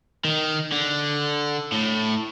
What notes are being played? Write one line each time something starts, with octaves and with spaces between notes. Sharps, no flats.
D#3
D3
A2